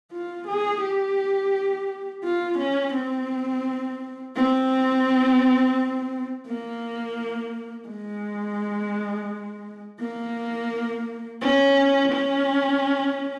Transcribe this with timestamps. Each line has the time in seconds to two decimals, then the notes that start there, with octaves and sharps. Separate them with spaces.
0.12 F4
0.47 G#4
0.82 G4
2.24 F4
2.58 C#4
2.94 C4
4.36 C4
6.47 A#3
7.89 G#3
10.00 A#3
11.42 C#4
12.12 C#4